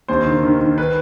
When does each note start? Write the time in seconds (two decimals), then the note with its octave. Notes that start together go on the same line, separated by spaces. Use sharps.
0.08 D#2 C5
0.26 D#3
0.43 D#3
0.61 D#3
0.78 B4